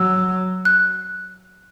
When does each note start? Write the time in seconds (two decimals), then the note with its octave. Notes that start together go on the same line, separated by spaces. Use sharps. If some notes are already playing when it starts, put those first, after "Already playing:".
Already playing: F#3 E6
0.65 F#6